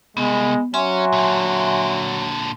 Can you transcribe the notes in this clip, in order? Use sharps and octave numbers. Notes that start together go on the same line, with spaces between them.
C2 G#3 B3
F#3 C#4 E5 G#5 C6
A#2 D3